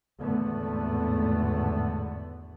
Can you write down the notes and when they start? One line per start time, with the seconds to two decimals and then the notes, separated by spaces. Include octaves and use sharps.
0.19 G#1 E2 A2 D3 A3 B3